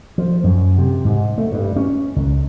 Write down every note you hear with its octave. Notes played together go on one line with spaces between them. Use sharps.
F3
F#2
C3
G#2
A3
G2
C#4
C#2